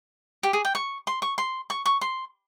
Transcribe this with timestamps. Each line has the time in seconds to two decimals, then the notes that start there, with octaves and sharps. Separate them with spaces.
0.43 G4
0.53 G#4
0.65 G5
0.75 C#6
1.07 C6
1.22 C#6
1.38 C6
1.70 C#6
1.86 C#6
2.01 C6